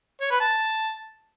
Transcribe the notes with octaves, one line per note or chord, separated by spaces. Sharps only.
C#5
B4
A5